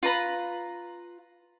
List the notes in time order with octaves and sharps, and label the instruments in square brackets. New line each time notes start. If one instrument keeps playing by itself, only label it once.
[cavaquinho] F4 B4 A#5 B5